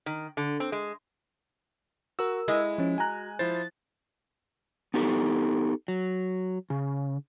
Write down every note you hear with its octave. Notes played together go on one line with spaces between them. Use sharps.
D#3
D3
C4
G#3
F#4 A#4 E6
G#3 E4
F3 C#4
F#4 G#5 A#5 F#6
F3 E4 C5 A6
B3 D#4 G4 A4
F#3
C#3